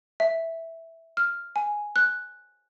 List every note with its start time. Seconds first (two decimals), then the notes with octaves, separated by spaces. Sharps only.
0.20 E5
1.17 F6
1.56 G#5
1.96 F#6